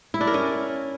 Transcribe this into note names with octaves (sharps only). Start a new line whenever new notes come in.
E4
D4
A#4
C#4